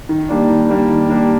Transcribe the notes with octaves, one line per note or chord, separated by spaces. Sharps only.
D#3
G3 A#3 D4
D#3
G3 A#3 D4
D#3
G3 A#3 D4